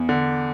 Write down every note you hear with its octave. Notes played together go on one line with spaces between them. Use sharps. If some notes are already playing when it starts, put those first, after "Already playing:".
Already playing: E2
D3